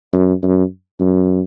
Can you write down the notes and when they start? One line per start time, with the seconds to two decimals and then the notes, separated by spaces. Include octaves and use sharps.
0.13 F#2
0.43 F#2
1.00 F#2